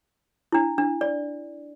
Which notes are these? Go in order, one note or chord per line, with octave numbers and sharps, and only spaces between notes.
D4 E4
D4
D5